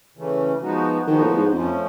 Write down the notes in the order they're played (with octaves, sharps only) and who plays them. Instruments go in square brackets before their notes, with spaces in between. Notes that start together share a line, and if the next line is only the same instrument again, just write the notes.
[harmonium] C#3 E3 A3 C#4
F3 G#3 B3 D#4 F#4
[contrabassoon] D#3 [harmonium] F3 G#3 B3 D#4 F#4
[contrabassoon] A2
G#2
[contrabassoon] F2 [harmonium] F3 A3 C#4